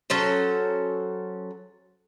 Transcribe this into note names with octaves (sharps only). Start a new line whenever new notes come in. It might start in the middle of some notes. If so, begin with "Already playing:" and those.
F#3 C#4 A4 C5